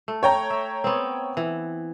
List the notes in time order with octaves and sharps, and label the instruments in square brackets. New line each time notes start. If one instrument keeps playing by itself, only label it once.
[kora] A3
[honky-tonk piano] C#5 G5 A#5
[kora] E5
B3 C4
E3